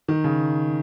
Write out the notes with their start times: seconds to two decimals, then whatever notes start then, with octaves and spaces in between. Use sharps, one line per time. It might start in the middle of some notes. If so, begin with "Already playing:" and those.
0.08 D#3
0.24 C#3